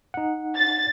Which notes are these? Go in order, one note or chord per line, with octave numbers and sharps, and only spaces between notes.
D#4 F#5
A6